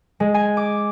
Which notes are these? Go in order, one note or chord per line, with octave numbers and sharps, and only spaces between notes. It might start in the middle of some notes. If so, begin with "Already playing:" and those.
G#3
G#5
D6